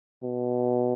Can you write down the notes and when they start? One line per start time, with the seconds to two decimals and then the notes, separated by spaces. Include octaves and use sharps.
0.23 B2